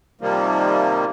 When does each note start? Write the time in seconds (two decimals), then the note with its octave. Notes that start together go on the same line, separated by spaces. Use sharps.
0.21 C3 D#3 F3 G3 A#3